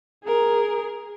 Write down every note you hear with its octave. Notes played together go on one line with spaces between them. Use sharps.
G#4 A#4